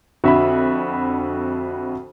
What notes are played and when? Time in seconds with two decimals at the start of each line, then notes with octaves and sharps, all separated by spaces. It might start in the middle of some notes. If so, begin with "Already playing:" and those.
0.24 F2 D3 F#4 E5 B5